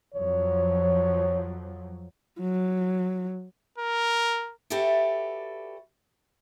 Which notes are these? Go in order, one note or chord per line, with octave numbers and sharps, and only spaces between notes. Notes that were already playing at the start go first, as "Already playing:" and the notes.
F2 F3 F#3 C#5
F#3
A#4
F#4 G4 A4 B4 D5 E5